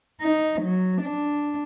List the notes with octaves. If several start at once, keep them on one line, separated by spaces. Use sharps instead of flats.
D#4
F#3
D4